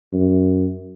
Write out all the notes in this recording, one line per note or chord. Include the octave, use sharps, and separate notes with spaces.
F#2